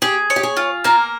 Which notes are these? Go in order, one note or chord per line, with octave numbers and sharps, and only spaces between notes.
G4 G#4
C#5
G4
G#4
F4
A#3 A#4